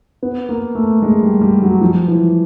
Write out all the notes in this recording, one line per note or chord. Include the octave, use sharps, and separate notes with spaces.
B3
A#3
A3
G#3
G3
G3
F#3
F3
E3